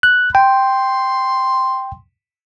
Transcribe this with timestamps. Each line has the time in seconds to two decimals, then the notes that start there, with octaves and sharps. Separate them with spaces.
0.03 F#6
0.35 G5 C6